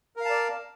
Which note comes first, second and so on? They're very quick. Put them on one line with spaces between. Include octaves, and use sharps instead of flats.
A#4 F5 A5 D5